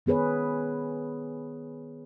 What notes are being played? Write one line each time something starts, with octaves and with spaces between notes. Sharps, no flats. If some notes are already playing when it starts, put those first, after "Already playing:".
D#3 B3 G#4 B4 C#5